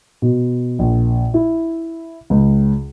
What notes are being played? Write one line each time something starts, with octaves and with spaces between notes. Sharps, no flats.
B2
A#1
E4
C#2